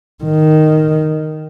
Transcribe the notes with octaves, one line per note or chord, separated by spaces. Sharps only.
D#3